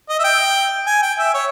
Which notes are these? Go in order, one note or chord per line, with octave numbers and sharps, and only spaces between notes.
D#5
E5
G5
G#5
G5
E5
C#5